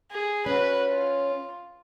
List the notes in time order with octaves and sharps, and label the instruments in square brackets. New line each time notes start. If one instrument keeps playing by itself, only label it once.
[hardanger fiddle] G#4
[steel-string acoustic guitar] C#4 [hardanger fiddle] F#4 B4
[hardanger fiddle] F4